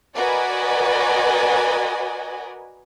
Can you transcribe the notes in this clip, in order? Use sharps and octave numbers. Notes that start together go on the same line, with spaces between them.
F#4 A#4 B4 D5 D#5 G#5